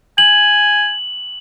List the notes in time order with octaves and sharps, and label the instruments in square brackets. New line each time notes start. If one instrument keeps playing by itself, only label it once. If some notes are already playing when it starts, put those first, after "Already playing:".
[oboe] G#5 [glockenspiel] F#7